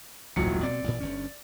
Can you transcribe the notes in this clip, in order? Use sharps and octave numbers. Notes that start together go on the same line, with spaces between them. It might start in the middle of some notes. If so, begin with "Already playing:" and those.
D#1 A1 G#2 F#3 C#7
B2 C4 D5
A1 A#2
G1 G2 C#4